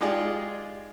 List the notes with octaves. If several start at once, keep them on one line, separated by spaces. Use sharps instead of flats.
G#3 D#4 F4 G4 G#4 D5